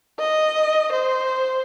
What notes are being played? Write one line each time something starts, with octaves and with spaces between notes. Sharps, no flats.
D#5
C5